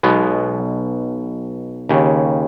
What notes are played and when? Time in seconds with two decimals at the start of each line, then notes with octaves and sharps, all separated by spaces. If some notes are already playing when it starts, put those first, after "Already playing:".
0.03 B1 B2 G#3 B3
1.89 D#2 C#3